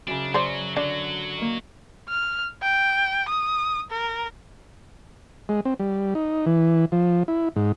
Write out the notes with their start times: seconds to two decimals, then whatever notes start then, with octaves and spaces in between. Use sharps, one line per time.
0.07 F#2 C#3 D4
0.34 F#3 C5 D5
0.77 D3 F#3 D4 F#4
1.37 D#3 A#3
2.09 F6
2.63 G5
3.29 D#6
3.90 A#4
5.49 G#3
5.65 C4
5.79 G3
6.15 D#4
6.46 E3
6.92 F3
7.28 E4
7.56 G#2